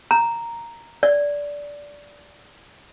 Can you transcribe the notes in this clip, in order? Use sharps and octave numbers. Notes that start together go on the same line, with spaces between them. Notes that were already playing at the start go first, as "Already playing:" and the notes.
A#5
D5